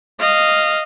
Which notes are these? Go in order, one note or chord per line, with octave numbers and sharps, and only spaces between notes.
D#5 F5